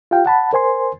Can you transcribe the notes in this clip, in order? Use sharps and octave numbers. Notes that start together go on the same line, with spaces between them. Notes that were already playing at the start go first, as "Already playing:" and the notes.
F4 G4 F5 G5
F#5 A5 B5
A#4 C5 G#5 C6